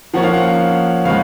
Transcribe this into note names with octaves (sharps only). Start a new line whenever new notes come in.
F3 A#3 C#4 F#5
F5
F#5
C#3 G#3 C#4 F5